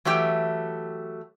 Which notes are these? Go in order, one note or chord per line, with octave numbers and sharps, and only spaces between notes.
E3 F#3 A3 G4 G5